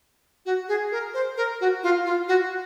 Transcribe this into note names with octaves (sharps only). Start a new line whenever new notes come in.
F#4
G#4
A#4
C5
A#4
F#4
F4
F4
F#4